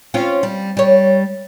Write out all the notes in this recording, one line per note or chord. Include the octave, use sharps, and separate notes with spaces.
C4 C#4 F4
G3
G3 C#5